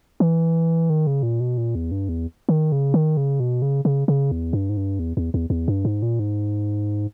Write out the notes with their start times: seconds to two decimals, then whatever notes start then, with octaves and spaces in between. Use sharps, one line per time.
0.20 E3
0.90 D#3
1.07 C#3
1.23 A#2
1.40 B2
1.58 A#2
1.75 E2
1.91 G2
2.09 E2
2.49 D#3
2.72 C#3
2.94 D#3
3.17 C#3
3.40 B2
3.62 C#3
3.85 C#3
4.08 C#3
4.31 E2
4.53 G2
4.69 G#2
4.77 G2
4.99 E2
5.17 E2
5.34 E2
5.50 E2
5.68 G2
5.85 G#2
6.02 A#2
6.20 G#2